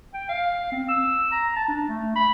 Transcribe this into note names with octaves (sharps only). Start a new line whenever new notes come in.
G5
F5
C4
E6
A#5
A5
D4
A3
B5